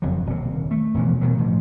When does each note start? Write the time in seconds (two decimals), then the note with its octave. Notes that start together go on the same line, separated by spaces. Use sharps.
0.02 F#1 F2 F#3
0.26 D#1 C3
0.71 A3
0.94 D#1 B2 E3 F3
1.21 B2 D#3 F#3
1.38 A2 F3